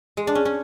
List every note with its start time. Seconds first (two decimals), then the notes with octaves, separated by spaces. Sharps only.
0.17 G#3
0.27 D4
0.35 C#4
0.45 C#4